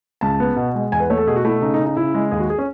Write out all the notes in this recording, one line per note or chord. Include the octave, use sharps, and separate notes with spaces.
C#2 A5
B3
B2
G#3
E2 G#5
B4
A3 C#5
A4
B2 G#4
F#4
A3 E4
C#3 D#4
D#4
C#3
D#4
C#3 E4
G#3
D#2 G#4
F#4
G#4
C#4